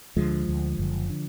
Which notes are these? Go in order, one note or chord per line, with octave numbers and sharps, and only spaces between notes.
D2 D3 F3 G#3
D2 D3
F#1 F#2 D3
D3